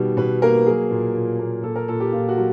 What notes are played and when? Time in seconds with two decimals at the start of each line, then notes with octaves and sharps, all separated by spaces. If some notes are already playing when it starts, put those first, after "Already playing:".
Already playing: B2 D#3 G3
0.17 B2 B4
0.42 A#3 A#4
0.66 F#3 G#4
0.91 A#2
1.15 A#2
1.39 A#3
1.63 A#2 A4
1.76 A#4
1.88 A#2 A4
2.00 G4
2.12 A#2 F4
2.29 F#4
2.38 F#3